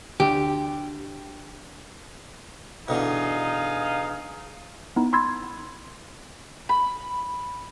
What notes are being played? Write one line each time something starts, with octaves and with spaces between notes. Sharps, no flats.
D2 G4
B2 D3 E3 D#4 G#4 F5
B3 D#4 E4
B5 C6 E6 G#6 A6
B5